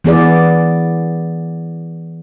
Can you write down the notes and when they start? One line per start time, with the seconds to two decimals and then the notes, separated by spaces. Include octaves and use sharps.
0.04 E3 B3 G#4 D5